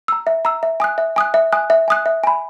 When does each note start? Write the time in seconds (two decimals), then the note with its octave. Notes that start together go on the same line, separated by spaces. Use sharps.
0.08 A#5 E6
0.27 E5
0.45 A#5 E6
0.63 E5
0.80 G#5 D#6 F#6
0.98 E5
1.16 G#5 D#6 F#6
1.34 E5
1.52 G#5 D#6 F#6
1.70 E5
1.88 G#5 D#6 F#6
2.06 E5
2.24 G#5 B5